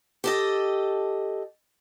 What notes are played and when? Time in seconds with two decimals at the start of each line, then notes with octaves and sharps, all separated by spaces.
0.24 G4 A4 D#5